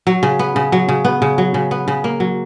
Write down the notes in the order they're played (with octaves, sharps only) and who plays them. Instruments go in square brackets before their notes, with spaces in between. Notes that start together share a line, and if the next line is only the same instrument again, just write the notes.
[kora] F#3
C#3
B3
C#3
F#3
C#3
B3
C#3
F#3
C#3
B3
C#3
A#3
F#3